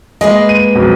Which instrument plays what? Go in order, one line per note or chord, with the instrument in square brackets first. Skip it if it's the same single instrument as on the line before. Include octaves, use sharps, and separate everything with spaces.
[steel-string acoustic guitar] G#3 A#3 B4 [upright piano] D#5
[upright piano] D#7
B1 F2 F#3